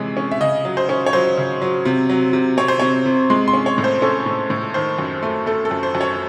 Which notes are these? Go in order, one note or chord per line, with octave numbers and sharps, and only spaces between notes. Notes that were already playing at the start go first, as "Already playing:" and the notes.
Already playing: C3 E3 G#3 C#5
C#4
E5
C#3 D#5
F#3
C5
C#4
C#5
F#3 C5
C#3
F#3
C3
F#3
C3
C4 C#5
C5
C3 C#5
C3
G#3 C6
C6
C#4
C#5
A2
C5
C#4 A4
A2
A2
D#3 C5
F#2
A3
A3 A4
A4
F#2
C5
F#2
C#5